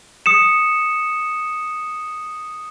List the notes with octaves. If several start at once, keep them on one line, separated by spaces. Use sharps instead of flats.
D#6 C#7 E7